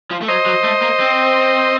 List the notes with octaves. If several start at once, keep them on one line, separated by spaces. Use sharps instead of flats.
F3
A3
F#3 C5 D#5
F#3
A3
A#3
C4